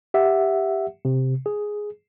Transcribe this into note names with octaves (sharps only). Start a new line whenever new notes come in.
G4 E5 F#5
C3
G#4